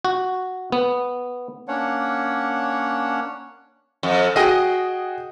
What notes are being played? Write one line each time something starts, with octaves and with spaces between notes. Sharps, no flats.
F#4
B3
A#3 C#4 D4 C#5 F#5
F2
F#4 G#4 D#5 G5